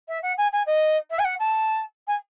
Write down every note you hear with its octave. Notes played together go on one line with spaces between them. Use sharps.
E5
F#5
G#5
G#5
D#5
E5
G#5
F#5
A5
G#5